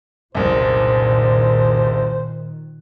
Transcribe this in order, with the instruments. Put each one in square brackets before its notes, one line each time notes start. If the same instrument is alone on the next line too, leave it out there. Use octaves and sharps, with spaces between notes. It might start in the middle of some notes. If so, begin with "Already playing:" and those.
[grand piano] F#1 C2 [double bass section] A#2 D#3 [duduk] C5